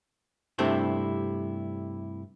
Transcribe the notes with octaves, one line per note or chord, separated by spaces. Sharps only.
G2 C3 A3 C4 D4 E4